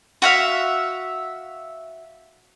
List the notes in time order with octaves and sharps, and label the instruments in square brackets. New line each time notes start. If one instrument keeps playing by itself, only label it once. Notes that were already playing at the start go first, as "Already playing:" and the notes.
[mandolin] F#4 E5 F5